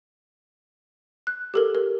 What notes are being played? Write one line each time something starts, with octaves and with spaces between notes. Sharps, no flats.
F#6
G4 A4 A#4
A#4